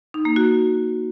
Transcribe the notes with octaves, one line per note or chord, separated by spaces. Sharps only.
D#4
A#3
F#4